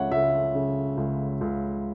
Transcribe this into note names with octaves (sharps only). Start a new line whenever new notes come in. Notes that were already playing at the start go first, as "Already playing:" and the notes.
Already playing: C#2 C#3 C#5 E5 F#5
C#2 E5
C#3
C#2
C#2